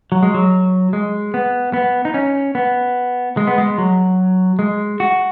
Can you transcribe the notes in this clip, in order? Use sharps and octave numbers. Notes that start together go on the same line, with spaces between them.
F#3
G#3
F#3
G#3
B3
B3
D#4
C#4
B3
G#3
B3
G#3
F#3
G#3
F#4